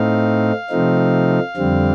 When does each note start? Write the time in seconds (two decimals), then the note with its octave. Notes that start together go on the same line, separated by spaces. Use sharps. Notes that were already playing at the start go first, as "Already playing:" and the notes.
Already playing: A2 A3 C4 D#4 F5
0.70 C3 F3 A3 C4 D#4
1.57 F2 D3 G3 C4